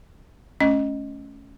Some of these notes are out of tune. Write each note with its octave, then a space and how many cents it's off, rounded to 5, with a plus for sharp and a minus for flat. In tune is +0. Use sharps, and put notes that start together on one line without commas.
A3 -25 C#4 +5 D#5 +0